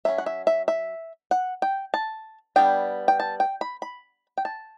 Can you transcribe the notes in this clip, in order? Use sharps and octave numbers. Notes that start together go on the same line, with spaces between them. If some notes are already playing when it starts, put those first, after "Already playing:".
F#3 C#4 E5
F#5
E5
E5
E5
F#5
G5
A5
G3 B3 D4 G5
G5
A5
G5
B5
B5
G5
A5